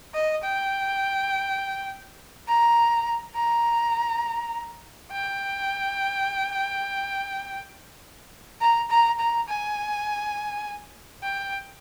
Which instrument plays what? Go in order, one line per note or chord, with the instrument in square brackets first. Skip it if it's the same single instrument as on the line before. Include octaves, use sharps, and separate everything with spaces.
[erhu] D#5
G5
A#5
A#5
G5
A#5
A#5
A#5
G#5
G5